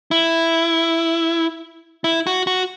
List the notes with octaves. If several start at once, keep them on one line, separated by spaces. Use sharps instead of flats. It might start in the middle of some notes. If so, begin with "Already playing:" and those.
E4
E4
F#4
F#4